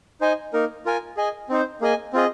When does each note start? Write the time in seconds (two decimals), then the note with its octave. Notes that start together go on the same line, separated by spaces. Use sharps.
0.21 D#4 C5 D#5 G#5
0.53 A#3 D#4 A#4
0.86 F4 A#4 G#5
1.17 G#4 D#5 G#5
1.49 C4 D#4 C5
1.81 A#3 G#4 D#5 G#5
2.13 C4 F4 G#4 D#5